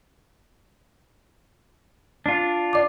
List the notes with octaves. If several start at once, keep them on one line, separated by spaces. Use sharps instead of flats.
D4 F4
D5 D6